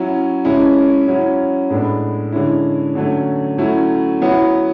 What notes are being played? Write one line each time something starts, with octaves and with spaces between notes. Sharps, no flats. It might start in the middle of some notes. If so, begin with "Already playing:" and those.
Already playing: F#3 C#4 E4
C#3 G#3 C#4 E4
F#3 C#4 E4
A2 G#3 B3 D4
D3 G#3 C#4 E4
D3 F#3 A3 C#4
F#3 A3 C#4 E4
F#3 B3 E4